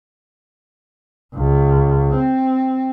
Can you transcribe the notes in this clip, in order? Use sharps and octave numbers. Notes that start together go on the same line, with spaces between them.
C#2
C4